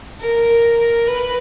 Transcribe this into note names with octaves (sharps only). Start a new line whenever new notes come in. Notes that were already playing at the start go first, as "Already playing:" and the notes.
A#4
B4